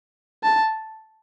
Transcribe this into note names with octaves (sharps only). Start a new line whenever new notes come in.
A5